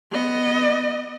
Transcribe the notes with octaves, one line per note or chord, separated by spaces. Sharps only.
B3 D#5